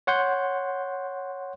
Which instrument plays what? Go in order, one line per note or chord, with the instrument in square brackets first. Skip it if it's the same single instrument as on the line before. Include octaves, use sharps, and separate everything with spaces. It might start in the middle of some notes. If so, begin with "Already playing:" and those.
[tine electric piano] C#5 F#5 C6 G6